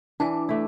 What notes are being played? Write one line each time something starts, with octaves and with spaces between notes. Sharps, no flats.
E3 D4
A3 E4